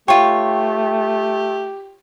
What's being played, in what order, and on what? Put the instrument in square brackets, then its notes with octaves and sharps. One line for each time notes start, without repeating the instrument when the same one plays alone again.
[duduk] A3 [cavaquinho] F4 C#5 [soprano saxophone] G4 [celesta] G5